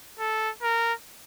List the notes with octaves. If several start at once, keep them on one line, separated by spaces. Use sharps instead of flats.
A4
A#4